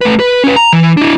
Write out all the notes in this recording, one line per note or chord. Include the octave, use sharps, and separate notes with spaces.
A3 B4
B4
C#4 B4
A#5
E3
D4 E4